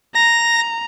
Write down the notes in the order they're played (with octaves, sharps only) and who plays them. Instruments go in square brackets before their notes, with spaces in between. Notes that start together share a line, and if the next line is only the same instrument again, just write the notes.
[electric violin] A#5 [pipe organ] A#6